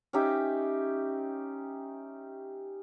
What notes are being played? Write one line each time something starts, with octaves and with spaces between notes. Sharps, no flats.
C#4 D#4 G4 E5